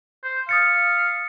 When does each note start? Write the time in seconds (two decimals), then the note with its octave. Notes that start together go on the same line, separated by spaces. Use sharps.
0.23 C5
0.49 F5 D#6 A6 C#7